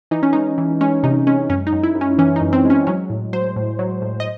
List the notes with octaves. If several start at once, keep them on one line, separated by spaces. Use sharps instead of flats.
E3 D#4
C#4
G#3 D#4
E3
G#3 C#4
C3 D#4
G#3 C#4
F#2 C#4
D#4
F#2
E4
F#2
C#4
E3 C#4
D#4
F#2
C4
G#3
C#4
F#3 C#4
A2
F#3 C5
A2
F#3
A2
D#5